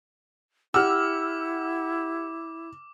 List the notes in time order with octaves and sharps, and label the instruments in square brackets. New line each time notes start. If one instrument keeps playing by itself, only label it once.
[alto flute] E4 [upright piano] G4 F#5 [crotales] D6 [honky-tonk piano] E6 F6